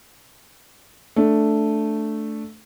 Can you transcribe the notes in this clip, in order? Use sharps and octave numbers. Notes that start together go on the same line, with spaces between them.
A3 D4